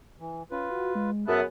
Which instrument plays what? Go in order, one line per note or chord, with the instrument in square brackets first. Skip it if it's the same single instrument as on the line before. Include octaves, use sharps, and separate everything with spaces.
[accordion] E3
[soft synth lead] C#4 [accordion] F4 B4
[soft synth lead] F#4
G#3
[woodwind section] F#2 B3 [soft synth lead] G#4 [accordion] E5 A5 F#6